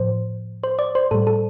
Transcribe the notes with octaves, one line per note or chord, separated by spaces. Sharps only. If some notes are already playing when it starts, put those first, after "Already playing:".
Already playing: A2 F3 C5
C5
D5
C5
A2 G3 A4
A4